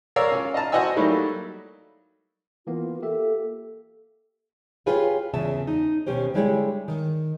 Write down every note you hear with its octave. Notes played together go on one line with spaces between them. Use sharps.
A#4 C#5 D5 F5 E6
C#4 F4
D#5 F5 A5 A#5
F#4 C5 D#5 F#5 G#5 E6
F#3 G3 A3 A#3 D#4 E4
E3 A#3 B3 F4
A#3 G4 A4 E5
F4 G4 G#4 B4 C#5 F5
E2 C#3 E5 A5
D#4
D#2 B2 C#4 G4 C5
D3 G3 G#3 E4 G4 C#5
D#3